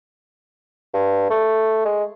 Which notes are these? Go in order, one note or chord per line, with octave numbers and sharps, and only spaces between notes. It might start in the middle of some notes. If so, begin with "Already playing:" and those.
G2
A3
G#3